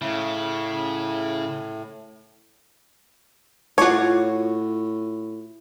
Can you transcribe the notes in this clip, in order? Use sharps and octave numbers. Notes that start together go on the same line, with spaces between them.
A2 C#3 E4
A2 F4 F#4 C#5 D6